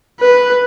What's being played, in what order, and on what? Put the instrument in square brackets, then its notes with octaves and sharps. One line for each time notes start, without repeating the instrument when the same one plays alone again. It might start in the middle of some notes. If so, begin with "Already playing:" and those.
[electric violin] B4